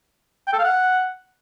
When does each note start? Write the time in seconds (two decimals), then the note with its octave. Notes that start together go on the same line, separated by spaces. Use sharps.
0.47 G5
0.53 A4
0.59 F5
0.65 F#5